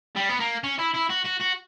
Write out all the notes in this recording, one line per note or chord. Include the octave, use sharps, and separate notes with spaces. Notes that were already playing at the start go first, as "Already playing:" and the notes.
G3
B3
A#3
C#4
E4
E4
F#4
F#4
F#4